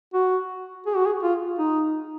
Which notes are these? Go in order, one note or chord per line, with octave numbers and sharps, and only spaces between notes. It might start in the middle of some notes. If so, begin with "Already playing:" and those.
F#4
G#4
F#4
G#4
F4
D#4